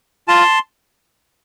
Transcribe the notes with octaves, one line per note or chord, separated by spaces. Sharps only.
F4 A5 C6